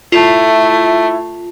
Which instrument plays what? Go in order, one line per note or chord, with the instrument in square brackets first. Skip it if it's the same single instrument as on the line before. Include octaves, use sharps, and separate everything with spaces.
[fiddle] A3 [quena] E4 [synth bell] F4